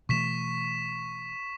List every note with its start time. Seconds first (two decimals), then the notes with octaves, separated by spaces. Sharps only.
0.09 B2 E3 A3 C#6 B6 E7